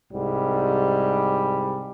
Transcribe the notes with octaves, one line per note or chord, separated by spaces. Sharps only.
C2 G#2 G3